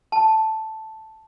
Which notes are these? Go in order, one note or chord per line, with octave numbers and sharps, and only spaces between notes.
A5